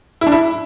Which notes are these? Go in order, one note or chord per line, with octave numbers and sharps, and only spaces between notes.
E4
D4
E4